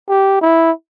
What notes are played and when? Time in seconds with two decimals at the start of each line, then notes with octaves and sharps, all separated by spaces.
0.09 G4
0.41 E4